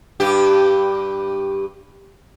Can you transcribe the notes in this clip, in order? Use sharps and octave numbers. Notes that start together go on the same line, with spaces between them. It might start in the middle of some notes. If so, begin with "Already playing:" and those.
G2 G4